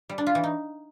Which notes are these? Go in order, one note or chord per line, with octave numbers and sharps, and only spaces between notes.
G3
D4
F4
E3
D#4